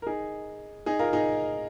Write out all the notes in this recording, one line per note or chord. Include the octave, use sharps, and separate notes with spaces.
A#4
D#4 G#4
D#4 G#4
F4 A#4
D#4 G#4